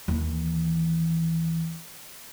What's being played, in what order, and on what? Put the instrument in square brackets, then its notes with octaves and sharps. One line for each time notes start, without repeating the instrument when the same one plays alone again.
[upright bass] D#2 E3